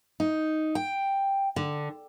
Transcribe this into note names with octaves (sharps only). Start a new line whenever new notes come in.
D#4
G5
D3